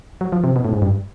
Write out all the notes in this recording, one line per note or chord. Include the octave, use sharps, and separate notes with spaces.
F#3
F3
C3
B2
A2
G#2
G2